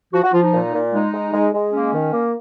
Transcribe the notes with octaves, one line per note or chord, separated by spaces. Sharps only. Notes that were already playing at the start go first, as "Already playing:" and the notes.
F3 F#4
F#4
F3 F4
D#4
A#2
A#2
G#3 D#4
G#3
G#3
G#3
A#3 C#4
D#3
A#3